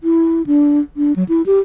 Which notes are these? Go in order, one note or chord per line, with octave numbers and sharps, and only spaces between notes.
E4
D4
D4
F#3
E4
G4